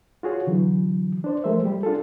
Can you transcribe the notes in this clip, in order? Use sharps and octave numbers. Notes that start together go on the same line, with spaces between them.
F4 F#4 G#4 C#5
D3 E3 F#3
D4 C5 D5
F3 G#3 A3 A#4 C5 E5
G3 G4
D4 F4 G#4 A4